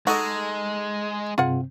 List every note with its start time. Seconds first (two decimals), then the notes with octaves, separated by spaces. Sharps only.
0.07 G#3 D#4 F#4 A4 D#5
1.38 G2 C3 C4 F4 G#4 F#5